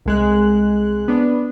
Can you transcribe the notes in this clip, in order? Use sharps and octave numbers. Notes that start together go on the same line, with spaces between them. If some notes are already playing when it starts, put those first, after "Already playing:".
C2 G#3 F#6
B3 D4